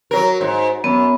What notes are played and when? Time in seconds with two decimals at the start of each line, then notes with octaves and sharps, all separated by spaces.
0.11 F#3 A#4
0.41 G#2
0.84 F#2 B3